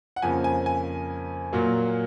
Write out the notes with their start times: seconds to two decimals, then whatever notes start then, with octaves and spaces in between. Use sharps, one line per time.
0.16 F#5
0.22 F2 C#3 F3 A#3 G#5
0.44 G#5
0.66 G#5
1.52 A#2 F#3 A#3